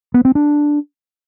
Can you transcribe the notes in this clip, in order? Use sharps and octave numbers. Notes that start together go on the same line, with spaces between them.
B3
C4
D4